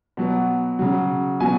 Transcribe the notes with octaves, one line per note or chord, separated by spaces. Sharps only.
B2 F#3
C#3 F#3
B2 F#3 G#5